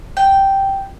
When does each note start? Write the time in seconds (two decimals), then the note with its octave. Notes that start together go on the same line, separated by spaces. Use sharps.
0.17 G5